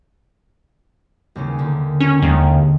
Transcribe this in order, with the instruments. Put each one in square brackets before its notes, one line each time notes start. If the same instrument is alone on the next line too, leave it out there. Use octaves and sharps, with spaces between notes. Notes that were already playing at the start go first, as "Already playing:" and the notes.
[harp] D#2 C#3 C#4
D#2 D3 D#3
[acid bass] C#4
[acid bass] D#2 [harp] D3 G#3